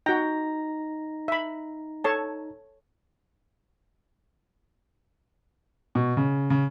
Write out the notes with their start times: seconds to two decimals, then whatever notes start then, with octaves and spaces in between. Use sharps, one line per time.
0.06 D#4 F#4 G5 A#5 A#6
1.28 E5 B5
2.04 A4 C#5 A5
5.95 B2
6.17 C#3
6.50 C#3